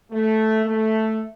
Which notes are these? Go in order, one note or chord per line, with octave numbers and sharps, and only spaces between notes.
A3
A3